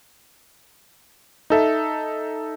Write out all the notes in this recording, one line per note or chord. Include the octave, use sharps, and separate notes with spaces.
D#4 A4 E5